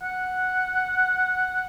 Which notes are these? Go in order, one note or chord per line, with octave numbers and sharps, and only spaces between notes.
F#5